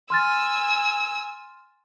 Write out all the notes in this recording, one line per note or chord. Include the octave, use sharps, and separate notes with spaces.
G#5 C6 E6 F6 A6